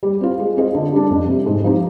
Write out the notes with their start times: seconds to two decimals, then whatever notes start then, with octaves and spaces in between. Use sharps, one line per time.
0.03 G3
0.21 C4 F4
0.39 G#3
0.57 C4 F4 G#4 D#5
0.75 D3
0.93 G3 D4
1.10 F2
1.28 C3 G3
1.46 G#2
1.64 F3 C4 D#4 G4